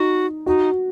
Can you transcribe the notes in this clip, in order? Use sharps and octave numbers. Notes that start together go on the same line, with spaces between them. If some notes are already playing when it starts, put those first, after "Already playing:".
Already playing: D#4 F#4
D#4 F#4